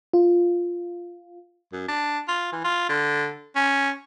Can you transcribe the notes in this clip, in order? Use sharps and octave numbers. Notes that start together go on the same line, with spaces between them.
F4
F#2
D4
F4
E3
F4
D3
C#4